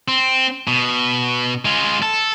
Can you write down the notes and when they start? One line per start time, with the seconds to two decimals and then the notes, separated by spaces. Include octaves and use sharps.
0.08 C4
0.67 B2
1.65 G#3 F4
2.02 A4